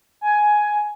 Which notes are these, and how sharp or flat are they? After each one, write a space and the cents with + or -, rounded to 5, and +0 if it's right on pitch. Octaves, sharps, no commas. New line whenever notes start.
G#5 +10